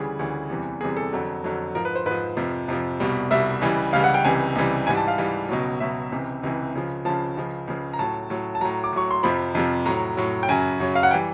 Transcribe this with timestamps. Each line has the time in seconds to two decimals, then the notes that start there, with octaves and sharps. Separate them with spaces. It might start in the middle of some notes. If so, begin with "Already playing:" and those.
Already playing: D2 C#3 E3 G3 G#4
0.19 D2 C#3 E3 G3
0.50 E2 C3 E3 G3
0.81 E2 C3 E3 G3 G#4
0.97 A4
1.13 F2 D3 F#3
1.44 F2 D3 F#3
1.75 G#2 F3 A#4
1.85 B4
1.95 C5
2.06 G#2 F3 B4
2.37 F2 C3 F3
2.68 F2 C3 F3
3.00 C2 B2 G3
3.31 C2 B2 G3 E5
3.61 C#2 C#3 E3 G3
3.93 C#2 C#3 E3 G3 F5
4.04 F#5
4.14 G5
4.24 C#2 C3 E3 G3 G#5
4.55 C#2 C3 E3 G3
4.87 G#2 E3 G3 G#5
4.97 A5
5.08 F5
5.18 G#2 E3 G3
5.49 C#2 B2 F#3
5.80 C#2 B2 F#3 E5
6.12 C#2 C3 E3
6.43 C#2 C3 E3
6.74 C#2 C#3 F3
7.05 C#2 C#3 F3 A5
7.37 C#2 C#3 F3
7.67 C#2 C#3 F3
7.93 A#5
7.99 A2 F#3 A5
8.30 A2 F#3
8.55 A5
8.61 A2 F#3 A#5
8.84 D6
8.93 A2 F#3 C#6
9.11 C6
9.23 F2 C3 F3 B5
9.55 F2 C3 F3
9.86 A2 F#3 A#5
10.17 A2 F#3
10.43 G5
10.49 F#2 C#3 F#3 G#5
10.80 F#2 C#3 F#3
10.95 F5
11.03 F#5
11.11 E3 G3 G5